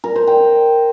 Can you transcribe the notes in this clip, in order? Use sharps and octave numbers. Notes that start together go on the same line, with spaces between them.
A#4
C5
G5